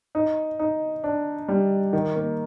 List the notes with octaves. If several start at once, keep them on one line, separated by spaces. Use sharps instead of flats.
D#4
D#4
D4
G3
D#3
A#3